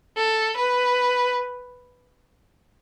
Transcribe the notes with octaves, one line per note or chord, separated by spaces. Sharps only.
A4
B4